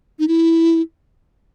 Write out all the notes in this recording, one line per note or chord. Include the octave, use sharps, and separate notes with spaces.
D#4
E4